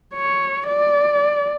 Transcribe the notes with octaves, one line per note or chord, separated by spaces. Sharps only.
C#5
D5